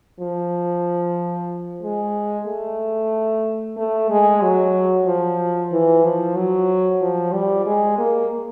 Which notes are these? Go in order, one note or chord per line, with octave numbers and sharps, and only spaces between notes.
F3
G#3
A3
A3
G#3
F#3
F3
E3
F3
F#3
F3
G3
G#3
A#3